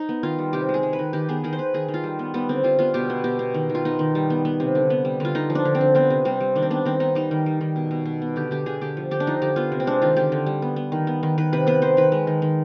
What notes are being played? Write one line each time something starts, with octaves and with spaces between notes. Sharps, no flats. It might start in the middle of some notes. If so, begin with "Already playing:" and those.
Already playing: D#4
B3
D#3 F4
G3
C3 G4
G#3
G#4
G#3
B4
D#3
D#3 G4
B3 G#4
D#3 G#4
C5
D#3 B4
D#3 G#4
D#3
F4
G3
B3
G3 B3
D3 C4
G3 F4
B3 F4
B2 G4
B3
B2 G4
B2
D#3
D#3
F4
B3 D#4
D#3
G3
B3
B3
C3
D3
B3
G3
D3 F4
D3 D#4
F3
D4
D3
C4
D3
B3 C4
C3
G3 C4
G3
D#3 D4
C4
B3 D4
D#3 C4
B3 D#4
G3 D#4
D#3
G3
D#3
B2
B2
B2
B3
D3 G4
D3 G4
D3 G#4
D3 G4
F3
D3 G4
D4
F3 D#4
D3 G4
B3 F4
C3
C4
G#3 D4
D#3 F4
D3 G4
D3
G3
B3
B3
D#3
B3
D#3
D#3 B4
C3 B4
B3 B4
D#3 C5
D#3 B4
G#3
D#3
D#3